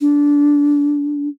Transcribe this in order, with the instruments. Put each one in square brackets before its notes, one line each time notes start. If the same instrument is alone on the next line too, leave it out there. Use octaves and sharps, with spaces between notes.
[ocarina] D4